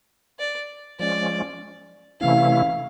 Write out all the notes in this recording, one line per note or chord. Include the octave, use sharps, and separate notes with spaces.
D5
F3 G#3 C#4 D5
C3 E3 A3 C#4 E4 F5